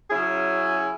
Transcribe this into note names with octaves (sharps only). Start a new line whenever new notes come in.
C#3 F#3 C#4 E4 G#4